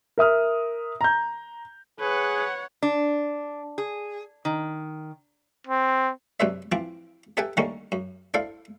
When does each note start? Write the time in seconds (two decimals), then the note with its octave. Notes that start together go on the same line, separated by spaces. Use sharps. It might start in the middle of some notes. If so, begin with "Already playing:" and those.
0.18 A#4 E5 D#6 F6
1.01 A#5 G6
2.00 G#4 B4 C#5 F#5
2.83 D4
3.78 G#4
4.45 D#3
5.67 C4
6.40 F#2 C3 D4 B4 C5 E5
6.72 E3 F3 C4 D6
7.37 G4 A4 B4 E5 G5 G#5
7.57 D3 D#3 G3 A3 A#3 C#4
7.92 F#2
8.34 D4 E4 A4 C5 F5